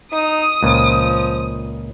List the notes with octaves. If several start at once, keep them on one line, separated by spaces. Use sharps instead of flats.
D#4 D#6
C#2 A#2 F3